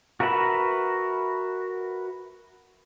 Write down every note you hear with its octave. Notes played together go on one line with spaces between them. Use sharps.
F#4 A#4 B4 E5 B5